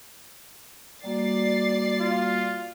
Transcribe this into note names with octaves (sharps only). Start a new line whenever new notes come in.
G3 A#3 F#4 D5 A6 C7
F4